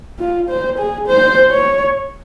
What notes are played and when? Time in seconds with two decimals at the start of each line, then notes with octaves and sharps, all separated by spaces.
0.19 F4
0.49 C5
0.78 G#4
1.07 C5
1.52 C#5